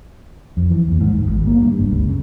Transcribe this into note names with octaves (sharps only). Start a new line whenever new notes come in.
F2
E3
D#2
G#2
D1
G#1
A#3
G2
F#1
C#2
C#3